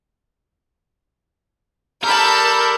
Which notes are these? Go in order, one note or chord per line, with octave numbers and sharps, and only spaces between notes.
G3 A4 A#4 A5 B5 F6 G6